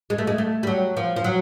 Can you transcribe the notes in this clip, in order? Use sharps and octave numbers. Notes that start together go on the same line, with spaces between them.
G#3
A3
G#3
A3
G3
F#3
F3
F3
F#3